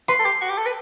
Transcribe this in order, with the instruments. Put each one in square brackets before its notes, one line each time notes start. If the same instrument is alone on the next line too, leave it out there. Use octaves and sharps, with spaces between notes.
[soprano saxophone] B4 [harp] C6
[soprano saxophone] A4
G4
F#4
G4
A4
B4